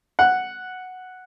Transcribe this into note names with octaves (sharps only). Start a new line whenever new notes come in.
F#5